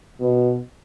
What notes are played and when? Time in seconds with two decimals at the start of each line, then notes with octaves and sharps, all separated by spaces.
0.20 B2